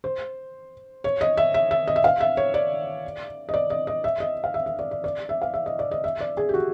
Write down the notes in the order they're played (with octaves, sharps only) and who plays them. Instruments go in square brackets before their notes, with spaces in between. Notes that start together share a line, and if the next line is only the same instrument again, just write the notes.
[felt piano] C5
C#5
D#5
E5
E5
E5
D#5
E5
F5
E5
C#5
D5
D#5
D5
D#5
D#5
E5
D#5
F5
E5
E5
D5
D5
D5
E5
F5
E5
D#5
D5
D#5
E5
D5
G#4
G4
F#4